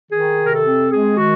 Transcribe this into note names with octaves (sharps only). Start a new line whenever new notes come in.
D#3 G#4
C3
A#4
A4
C4
G#3 G#4
D#3 F#4